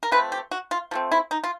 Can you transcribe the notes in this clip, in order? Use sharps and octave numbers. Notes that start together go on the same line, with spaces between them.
A#4
F3 A3 C4 B4
G4
F#4
F4
F3 A3 C4
E4
D#4
F4